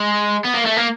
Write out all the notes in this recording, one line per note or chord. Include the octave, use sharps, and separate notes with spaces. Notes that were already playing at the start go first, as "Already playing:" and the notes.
Already playing: G#3
B3
A#3
A3
A#3